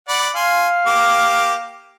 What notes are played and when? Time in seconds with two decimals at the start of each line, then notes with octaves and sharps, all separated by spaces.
0.09 D5 F#5 B5
0.35 F5 G#5 C6
0.86 A#3 G4 D6